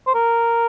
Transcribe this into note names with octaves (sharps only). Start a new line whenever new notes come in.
C5
A#4